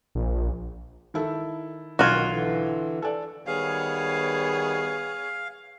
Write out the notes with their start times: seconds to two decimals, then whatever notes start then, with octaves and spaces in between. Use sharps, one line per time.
0.15 A#1
1.14 D#3 E4 A4
1.99 B1 D#3 F4 F#4 G#6
2.28 D3 E3
3.02 A4 D5
3.47 D#3 G3 B3 G#4 C#5 F5